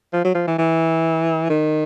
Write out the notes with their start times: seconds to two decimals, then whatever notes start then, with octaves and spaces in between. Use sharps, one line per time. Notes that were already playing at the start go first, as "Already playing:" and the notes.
0.13 F3
0.25 F#3
0.35 F3
0.47 E3
0.59 E3
1.50 D#3